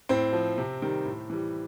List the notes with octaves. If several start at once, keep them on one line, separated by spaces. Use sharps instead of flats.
A2 C4
F3
C3
D#3 G3
A2
E3 G3